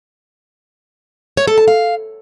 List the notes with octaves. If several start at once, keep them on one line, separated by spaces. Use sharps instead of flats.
C#5
A4
A5
F5